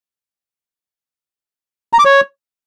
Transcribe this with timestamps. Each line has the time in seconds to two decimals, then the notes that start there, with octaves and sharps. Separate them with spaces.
1.93 A#5
1.99 D6
2.05 C#5